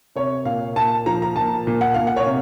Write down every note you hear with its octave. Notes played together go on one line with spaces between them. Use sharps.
C3 C#5
A#2 F5
A#2 A5
F3 A#5
A#5
A#2 A5
A#2
F#5
A#2 F5
F#5
C#5
C3